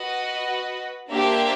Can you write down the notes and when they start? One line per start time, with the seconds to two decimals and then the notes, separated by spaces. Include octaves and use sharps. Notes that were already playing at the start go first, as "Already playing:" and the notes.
Already playing: F#4 B4 D#5
1.10 A#3 D4 G4 C5 E5